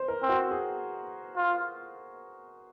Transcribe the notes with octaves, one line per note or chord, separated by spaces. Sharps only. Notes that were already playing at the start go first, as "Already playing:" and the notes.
Already playing: C5
A#4
C4
F#4
G#4
F4